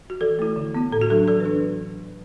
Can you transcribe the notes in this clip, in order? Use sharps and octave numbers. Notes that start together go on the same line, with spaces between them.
F#4
E3 A4
A3 E4
D3
B3 E4
A2 A4
F#4
F#3 D4 A4
E3 A4
B4
D4